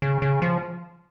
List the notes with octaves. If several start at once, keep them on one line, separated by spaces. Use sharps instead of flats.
C#3
C#3
F3